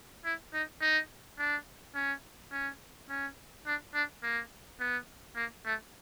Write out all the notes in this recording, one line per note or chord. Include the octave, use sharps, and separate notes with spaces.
E4
D#4
D#4
D4
C#4
C#4
C#4
D4
D4
A#3
B3
A#3
A3